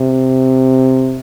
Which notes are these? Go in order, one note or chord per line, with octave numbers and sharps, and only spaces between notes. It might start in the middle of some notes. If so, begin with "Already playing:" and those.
Already playing: C3